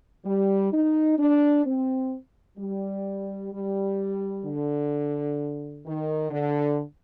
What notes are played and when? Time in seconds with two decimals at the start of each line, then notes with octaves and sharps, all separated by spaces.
0.25 G3
0.72 D#4
1.18 D4
1.65 C4
2.57 G3
3.51 G3
4.44 D3
5.84 D#3
6.30 D3